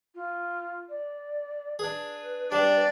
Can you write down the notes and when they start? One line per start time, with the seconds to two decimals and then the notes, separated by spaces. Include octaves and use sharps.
0.15 F4
0.89 D5
1.79 D4 G#4 B4
2.52 G3 D4 D5